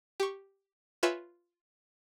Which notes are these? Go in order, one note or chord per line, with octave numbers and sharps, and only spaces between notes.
G4 C#6
F4 B4 C#5 E5 G#5 E6